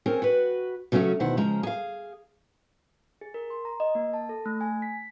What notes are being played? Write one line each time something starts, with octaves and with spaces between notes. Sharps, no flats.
C4 C#4 G#4 A#4 C5
F#4 B4
C#3 F#3 A3 C4 C#4 F#4
D2 B2 D#3 E4 C5 F#5
C#3 F3 G#3 A#5
G#4 F5
G#4
A#4
C6
A#5
D#5
A#3
A5
A4
A3
G#5
B6